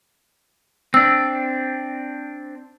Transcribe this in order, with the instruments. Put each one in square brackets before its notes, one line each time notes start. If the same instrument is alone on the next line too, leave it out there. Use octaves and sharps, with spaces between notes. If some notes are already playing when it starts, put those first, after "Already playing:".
[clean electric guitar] C4 D4 [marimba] E6